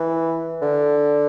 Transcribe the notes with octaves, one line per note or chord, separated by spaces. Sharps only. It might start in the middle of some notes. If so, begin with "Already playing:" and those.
Already playing: E3
D3